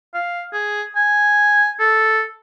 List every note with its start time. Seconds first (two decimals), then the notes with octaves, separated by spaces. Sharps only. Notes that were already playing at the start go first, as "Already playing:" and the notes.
0.14 F5
0.53 G#4
0.96 G#5
1.80 A4